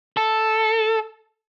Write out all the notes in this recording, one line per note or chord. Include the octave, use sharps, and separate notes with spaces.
A4